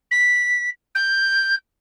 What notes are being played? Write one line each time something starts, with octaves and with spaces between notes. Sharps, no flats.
B6
G6